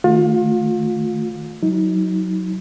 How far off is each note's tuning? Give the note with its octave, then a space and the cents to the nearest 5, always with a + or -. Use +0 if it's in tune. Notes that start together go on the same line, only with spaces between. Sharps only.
D#3 +0 A3 +0 F4 +35
F#3 +0 D#4 +35